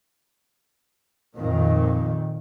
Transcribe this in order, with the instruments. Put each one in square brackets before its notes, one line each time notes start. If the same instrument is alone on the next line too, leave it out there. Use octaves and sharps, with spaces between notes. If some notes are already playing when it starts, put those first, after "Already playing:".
[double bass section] F2 A#2 D#3